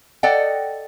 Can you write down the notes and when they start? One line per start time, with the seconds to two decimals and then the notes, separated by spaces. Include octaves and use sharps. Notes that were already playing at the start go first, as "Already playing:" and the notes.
0.23 A4 D5 D#5 F#5 G5